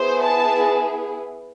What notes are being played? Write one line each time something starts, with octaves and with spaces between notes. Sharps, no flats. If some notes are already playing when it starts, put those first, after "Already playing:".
Already playing: B3 E4 G#4 C5
A5